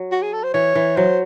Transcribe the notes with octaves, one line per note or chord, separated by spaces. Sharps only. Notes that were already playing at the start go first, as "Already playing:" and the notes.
Already playing: F#3
F#4
G#4
A4
C5
E3 C#5
E3
F#3 C5